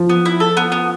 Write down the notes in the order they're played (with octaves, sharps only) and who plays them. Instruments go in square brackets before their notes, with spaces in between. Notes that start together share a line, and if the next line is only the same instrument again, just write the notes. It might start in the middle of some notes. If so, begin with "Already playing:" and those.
Already playing: [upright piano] F3
[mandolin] B3
E4
A4
B3
B3